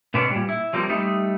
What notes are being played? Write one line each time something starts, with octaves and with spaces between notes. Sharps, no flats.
B2 D3 B3 C#4 D4
A#2 G3
E4
F3 G3 A#3 C4
G3 A3 D#4